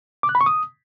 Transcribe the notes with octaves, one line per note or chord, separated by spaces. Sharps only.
D6
F#6
B5
C#6
D#6